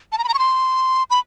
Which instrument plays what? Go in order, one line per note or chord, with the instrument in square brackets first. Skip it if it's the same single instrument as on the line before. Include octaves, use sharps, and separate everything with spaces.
[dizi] A5
A#5
B5
A#5
C#6
C6
B5